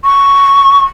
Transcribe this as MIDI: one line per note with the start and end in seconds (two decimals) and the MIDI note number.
0.04 0.82 85